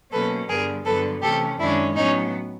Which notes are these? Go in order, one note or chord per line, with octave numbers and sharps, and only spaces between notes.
B2 F#3 A#3 C#4 A4 B4
G2 D3 G3 B3 G#4 A#4
G2 D3 F#3 B3 A4 B4
C3 E3 A3 C#4 G4 A4
F#2 D#3 G#3 C#4 D4 E4
A2 F#3 B3 C#4 D#4